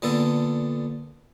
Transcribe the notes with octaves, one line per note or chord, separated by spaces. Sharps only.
A#2 D3 B3 A4